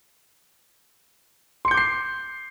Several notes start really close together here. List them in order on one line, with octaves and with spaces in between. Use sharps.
C6 C#7 G6 D6 C7